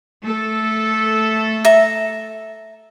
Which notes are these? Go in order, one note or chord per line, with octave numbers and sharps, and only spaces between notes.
A3 A4
E5 A#5